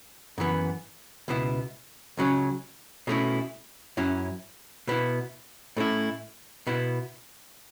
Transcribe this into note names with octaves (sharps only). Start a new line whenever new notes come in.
F#2 E3 B3
C#2 B2 B3 E4
C#2 C#3 F#3 C#4
B2 A3 C#4 E4
F#2 F#3 C#4 E4
B2 B3 E4
A2 A3 C#4 E4
B2 B3 E4